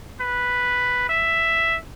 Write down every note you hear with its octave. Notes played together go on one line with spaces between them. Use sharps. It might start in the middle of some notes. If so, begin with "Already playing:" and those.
B4
E5